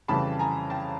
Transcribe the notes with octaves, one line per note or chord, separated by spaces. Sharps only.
F2 C#3 E3 G3 A5 B5
G#5 A#5
G5 A5